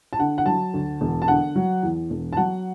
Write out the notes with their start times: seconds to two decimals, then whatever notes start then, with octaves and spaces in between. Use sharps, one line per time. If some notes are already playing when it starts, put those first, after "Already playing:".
0.13 A5
0.19 D3 F#5
0.38 F#5
0.46 F#3 A5
0.74 D2
1.01 E1
1.22 A5
1.28 D3 F#5
1.56 F#3
1.83 E2
2.10 E1
2.33 A5
2.37 F#3 F#5